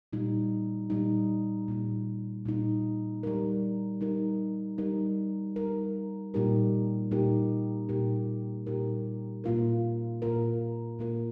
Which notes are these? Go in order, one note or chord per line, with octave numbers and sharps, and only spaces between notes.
A#2 G3 D#4
A#2 G3 D#4
A#2 G3 D#4
A#2 G3 D#4
G3 D#4 A#4
G3 D#4 A#4
G3 D#4 A#4
G3 D#4 A#4
A#2 G3 D#4 G4 A#4
A#2 G3 D#4 G4 A#4
A#2 G3 D#4 G4 A#4
A#2 G3 D#4 G4 A#4
A#2 A#3 F4 A#4
A#2 A#3 F4 A#4
A#2 A#3 F4 A#4